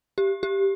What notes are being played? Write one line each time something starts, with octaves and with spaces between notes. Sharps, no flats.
G4
G4